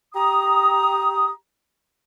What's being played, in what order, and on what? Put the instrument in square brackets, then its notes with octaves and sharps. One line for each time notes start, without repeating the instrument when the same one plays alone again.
[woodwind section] G4 A#5 D#6